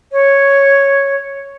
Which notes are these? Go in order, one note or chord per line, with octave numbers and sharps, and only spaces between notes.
C#5